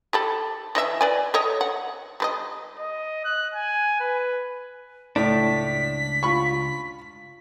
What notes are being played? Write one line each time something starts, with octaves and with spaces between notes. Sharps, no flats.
G4 A4 B5
E3 D#5 E5
B4 D5 G#5
A4 C#5 D#5
F#5
G3 B4 D#5
D#5
F#6
G#5
B4
C#2 A2 D4 B6
F4 B5 C#6